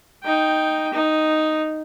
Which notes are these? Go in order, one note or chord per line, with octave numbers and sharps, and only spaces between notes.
D#4 G5
D#4